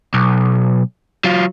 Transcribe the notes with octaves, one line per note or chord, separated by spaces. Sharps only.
B1
F#3 F4